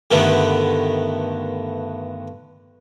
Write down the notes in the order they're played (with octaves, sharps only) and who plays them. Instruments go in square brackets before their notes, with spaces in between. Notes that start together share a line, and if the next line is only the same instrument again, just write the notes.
[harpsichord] G2 D3 D#3 A3 B3